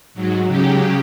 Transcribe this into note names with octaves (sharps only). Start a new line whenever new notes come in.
G#2 F#3
C#3 F#3 G4